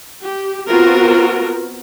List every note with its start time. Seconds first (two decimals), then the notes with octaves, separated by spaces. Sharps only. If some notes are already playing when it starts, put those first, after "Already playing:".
0.21 G4
0.68 B3 C4 F4 F#4 A#4